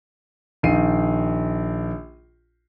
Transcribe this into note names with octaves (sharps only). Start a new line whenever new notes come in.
A#1 D#3 F5 C7 D#7